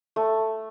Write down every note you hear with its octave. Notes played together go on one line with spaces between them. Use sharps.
A3